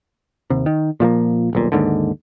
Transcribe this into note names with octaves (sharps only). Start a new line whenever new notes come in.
D#2 C3
D#3
A#2 F3 A3 A#3
D#1 B1 A#2
D#2 G#2 D3